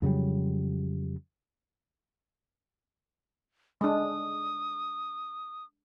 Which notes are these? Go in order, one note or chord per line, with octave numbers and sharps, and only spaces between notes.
F2 C#3 F#3 G3
G#3 D4 D#6